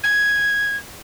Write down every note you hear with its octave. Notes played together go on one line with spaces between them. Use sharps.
G#6